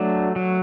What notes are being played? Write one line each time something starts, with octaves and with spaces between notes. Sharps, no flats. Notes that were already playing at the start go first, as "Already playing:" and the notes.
Already playing: F#3 A3 D4
F#3